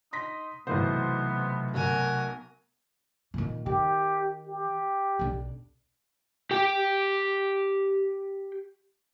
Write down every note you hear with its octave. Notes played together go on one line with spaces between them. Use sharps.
D#4 C6 A#6 B6
B1 C3 E3 F#3 A3 B3 C5
B1 F#4 A#4 G#5
A#2 D#3
D#3 G4
G4
B1 D4
G4 G5